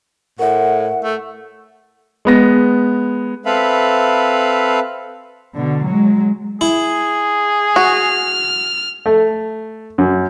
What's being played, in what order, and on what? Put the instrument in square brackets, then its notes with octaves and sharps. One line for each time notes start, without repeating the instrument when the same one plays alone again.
[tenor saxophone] A2 [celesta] A#4 E5 [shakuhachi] F#5
[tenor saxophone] A3
[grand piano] G#3 B3 A#6
[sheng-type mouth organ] C4 A4 B4 E5 F5 B5
[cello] B2 D3
F#3 G#3
[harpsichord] E4 [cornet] G#4
[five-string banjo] F#4 [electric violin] F6
[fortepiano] A3
F#2